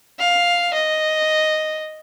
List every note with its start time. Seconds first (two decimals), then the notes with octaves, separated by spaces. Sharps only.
0.19 F5
0.74 D#5